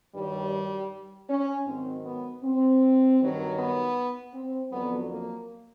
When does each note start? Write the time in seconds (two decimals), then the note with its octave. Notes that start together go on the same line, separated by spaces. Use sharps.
0.14 G2 D#3 F#3 G3
1.30 C#4
1.67 G#2 D#3 F#3 C4
2.05 B3
2.44 C4
3.20 G2 D#3 F#3
3.58 B3
4.34 C4
4.72 F2 D3 F#3 B3
5.10 A#3